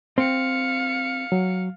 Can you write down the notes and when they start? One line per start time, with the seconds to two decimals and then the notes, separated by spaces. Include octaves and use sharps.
0.18 C4 F5 C#7
1.32 F#3